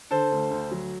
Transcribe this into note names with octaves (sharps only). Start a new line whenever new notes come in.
D3 A4 C5
D2
D2
F#3